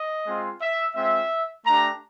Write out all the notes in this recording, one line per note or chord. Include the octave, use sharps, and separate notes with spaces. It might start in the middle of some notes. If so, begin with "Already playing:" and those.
Already playing: D#5
G#3 C4 F4
E5
G#3 C4 F4 E5
A3 D4 G4 A#5